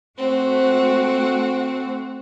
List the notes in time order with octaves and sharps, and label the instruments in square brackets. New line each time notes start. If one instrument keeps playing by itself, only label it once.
[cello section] A3 F#4 [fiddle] C4